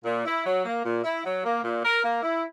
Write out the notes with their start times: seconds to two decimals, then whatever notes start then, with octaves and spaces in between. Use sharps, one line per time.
0.05 A#2
0.25 E4
0.45 F#3
0.65 A#3
0.85 A#2
1.04 E4
1.25 F#3
1.44 A#3
1.63 A#2
1.84 A#4
2.03 A#3
2.23 E4